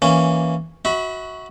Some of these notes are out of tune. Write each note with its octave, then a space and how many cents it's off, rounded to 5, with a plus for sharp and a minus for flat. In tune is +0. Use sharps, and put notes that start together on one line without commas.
E3 +0 A#3 +0 C#4 +0
F#4 +0 E5 -35 B5 +10